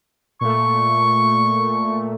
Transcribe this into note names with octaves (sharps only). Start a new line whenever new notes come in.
A#2 A3 C#6